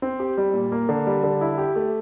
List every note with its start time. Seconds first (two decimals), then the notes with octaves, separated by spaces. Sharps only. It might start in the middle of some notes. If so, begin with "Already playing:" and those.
0.02 C4
0.20 G4
0.38 G3
0.54 A#2
0.72 A#3
0.89 D3
1.07 G3
1.24 D3
1.41 E4
1.58 G4
1.76 A3